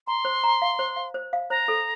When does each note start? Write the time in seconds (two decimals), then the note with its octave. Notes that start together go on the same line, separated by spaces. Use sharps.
0.07 A#5 C6
0.25 C5
0.44 A#5
0.62 F5
0.79 C5
0.96 F5
1.14 C5
1.33 F5
1.50 C5 A#5
1.68 A4